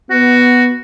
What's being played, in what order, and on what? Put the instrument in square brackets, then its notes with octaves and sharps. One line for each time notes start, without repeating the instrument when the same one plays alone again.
[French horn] B3 [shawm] F#4